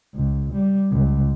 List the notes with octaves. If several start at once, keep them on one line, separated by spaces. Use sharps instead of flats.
C#2
G3
C#2